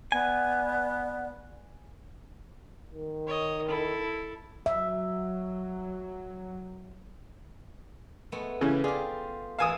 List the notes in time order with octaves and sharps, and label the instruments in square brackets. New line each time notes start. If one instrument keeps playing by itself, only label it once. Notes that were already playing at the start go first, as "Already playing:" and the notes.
[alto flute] B3 [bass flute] D5 [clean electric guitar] G#5
[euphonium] D#3
[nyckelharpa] C#5 D#5
E4 A4
[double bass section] F#3 [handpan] E5
[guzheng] G#3 A3 B3
[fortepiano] C#3 E3 C#4
[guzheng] F4 G4 [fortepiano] G#4 D5
[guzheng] E3 A4 E5 [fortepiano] F5 G#5 D#6